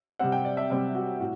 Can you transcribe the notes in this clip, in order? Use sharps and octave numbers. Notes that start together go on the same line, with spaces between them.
C3 G3 C4 F#5
G5
D5
E5
C3 G3 C4 E5
F#4
A2 F#4